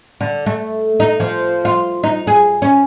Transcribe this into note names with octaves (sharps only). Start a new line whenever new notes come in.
D3
A3
D#4
F3
F4
D#4
G#4
C#4